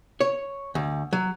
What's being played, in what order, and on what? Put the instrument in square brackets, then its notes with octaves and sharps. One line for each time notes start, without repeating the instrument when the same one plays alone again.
[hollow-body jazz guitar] C#5
D2
F#3